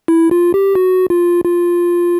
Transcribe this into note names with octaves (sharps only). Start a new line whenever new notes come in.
E4
F4
G4
F#4
F4
F4